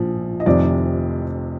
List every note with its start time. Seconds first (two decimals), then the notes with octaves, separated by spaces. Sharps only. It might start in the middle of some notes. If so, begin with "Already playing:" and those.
Already playing: A#1 A#2 F3
0.40 D#5
0.46 F1 F2 C3 D#3 D5